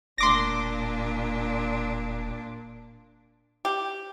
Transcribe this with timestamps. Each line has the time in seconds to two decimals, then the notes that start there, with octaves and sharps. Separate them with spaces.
0.18 E1 A#2 D4 C6 D6 A#6
3.65 G4